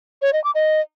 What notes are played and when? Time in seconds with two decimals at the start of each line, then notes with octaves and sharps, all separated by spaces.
0.22 C#5
0.33 D#5
0.44 D6
0.55 D#5